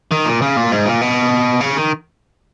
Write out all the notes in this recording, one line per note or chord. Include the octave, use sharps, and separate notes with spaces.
D#3
A#2
C#3
A#2
G#2
A#2
B2
C#3
D#3